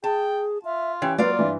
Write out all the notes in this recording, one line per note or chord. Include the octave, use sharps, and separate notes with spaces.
G#4 G5 A5
F4 E5
E3 C#4 G4 G5
F#3 A#3 F4 B4 D5 F5
G2 E3 E5